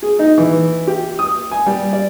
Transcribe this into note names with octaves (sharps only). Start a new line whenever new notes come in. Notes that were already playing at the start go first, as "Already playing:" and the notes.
G#4
D#4
E3
G4
D#6
G#5
G3
D5